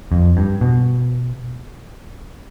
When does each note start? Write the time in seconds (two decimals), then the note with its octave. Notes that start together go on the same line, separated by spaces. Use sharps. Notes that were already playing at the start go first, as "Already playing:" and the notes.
0.12 F2
0.37 G2
0.61 B2